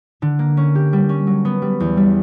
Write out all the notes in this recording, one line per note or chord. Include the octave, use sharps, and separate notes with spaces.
D3
A#3
C#4
G4
G3
C#4
F#3
B3
G3
E2
G3